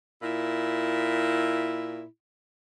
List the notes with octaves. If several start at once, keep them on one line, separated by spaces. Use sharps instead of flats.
A#2 E4